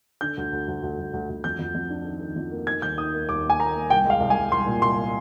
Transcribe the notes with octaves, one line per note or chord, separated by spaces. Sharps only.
D3 G6
D2
D2
D2
D2
D2
D2
D2
F2 G6
F2
F2
D4
D#3
D#3
F2
A#3
D#4 G#6
D#2 G6
D#3 D#6
A#3
D#2 D6
A#3
G#5
A#3 A#5
A#3
C2 G5
G#3 F5
C2
G#5
C2
C2 C6
A#2
C2 C6